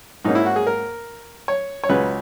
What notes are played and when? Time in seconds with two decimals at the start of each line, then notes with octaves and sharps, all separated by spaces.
0.25 G#2 F#3 A#3 C#4 D#4
0.35 E4
0.46 F#4
0.56 G#4
0.67 A#4
1.48 C#5
1.84 C#5
1.89 C#2 C#3 F#3 C#4 B4